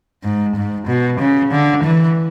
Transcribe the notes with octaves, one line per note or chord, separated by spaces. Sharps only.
G#2
G#2
B2
C#3
D3
E3